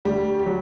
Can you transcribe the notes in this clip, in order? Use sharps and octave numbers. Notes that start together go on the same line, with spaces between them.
D2 D3 G3 G4
G4
F#3